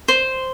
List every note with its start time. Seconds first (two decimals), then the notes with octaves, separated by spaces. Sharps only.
0.08 C5